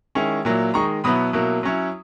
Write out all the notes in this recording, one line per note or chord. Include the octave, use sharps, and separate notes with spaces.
D#3 G#3 C#4 E4
A#2 F#3 A#3 E4
D#3 G#3 D#4 A#5 C#6
B2 F#3 B3 E4 B5 D#6
B2 F#3 A#3 E4
F#3 C#4 E4